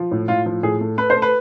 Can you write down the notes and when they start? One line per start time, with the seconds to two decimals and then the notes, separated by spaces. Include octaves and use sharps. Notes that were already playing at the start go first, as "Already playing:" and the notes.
Already playing: F3
0.11 A2
0.28 A2 F4
0.46 F3
0.63 A2 G#4
0.81 A3
0.98 A3 B4
1.10 C5
1.16 A3
1.22 B4